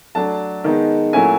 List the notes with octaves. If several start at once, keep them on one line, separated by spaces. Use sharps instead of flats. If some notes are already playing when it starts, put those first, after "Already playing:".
F#3 A3 D4 A5
D#3 G#3 B3 D#4
A#2 F#3 A3 C#4 E4 G#5